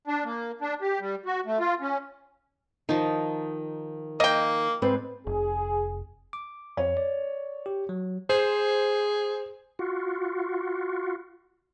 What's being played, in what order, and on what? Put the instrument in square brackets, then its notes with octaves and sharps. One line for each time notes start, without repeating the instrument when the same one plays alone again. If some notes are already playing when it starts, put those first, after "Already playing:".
[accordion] D4
A#3
D4
G4
G3
F#4
A3
F4
C#4
[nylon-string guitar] D#3 [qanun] F3 D#4
[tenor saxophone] A#3 [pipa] D#5 G5
[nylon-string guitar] G#2 C4 B4
[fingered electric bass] F1 [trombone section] G#4
[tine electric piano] D6
[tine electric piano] F2 [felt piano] C#5
[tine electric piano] D5
G4
F#3
[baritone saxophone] G#4 [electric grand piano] C5
[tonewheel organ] F4 F#4